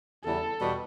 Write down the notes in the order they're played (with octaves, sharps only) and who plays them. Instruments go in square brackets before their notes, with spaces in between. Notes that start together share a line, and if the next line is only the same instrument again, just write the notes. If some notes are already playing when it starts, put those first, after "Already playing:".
[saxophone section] E2 C#3 E3 G3 [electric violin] A4
[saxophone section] E2 B2 G3